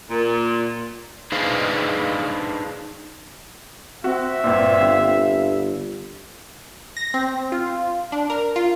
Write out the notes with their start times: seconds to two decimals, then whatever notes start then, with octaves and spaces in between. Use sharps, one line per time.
0.10 A#2
1.32 D4 D#4 G#4 B4 C5 F5
4.04 C4 F#4 E5
4.44 G1 A#2
4.80 G1 F5
6.97 A#6
7.14 C4
7.52 F4
8.12 D4
8.30 A#4
8.56 F4